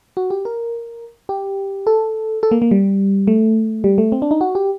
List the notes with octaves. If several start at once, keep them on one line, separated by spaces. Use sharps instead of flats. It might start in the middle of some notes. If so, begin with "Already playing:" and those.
F#4
G4
A#4
G4
A4
A4
A#3
A#3
G3
A3
G3
A3
C4
D4
D#4
F#4
G4